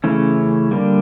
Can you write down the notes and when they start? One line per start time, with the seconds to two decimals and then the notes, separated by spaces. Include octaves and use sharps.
0.04 C#3 E3 A3 C#4
0.71 D3 G3 A#3